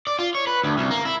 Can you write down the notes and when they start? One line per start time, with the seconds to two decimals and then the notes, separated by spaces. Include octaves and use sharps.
0.07 D5
0.19 F4
0.35 C#5
0.47 B4
0.64 D2
0.78 C2
0.91 A#3
1.05 E4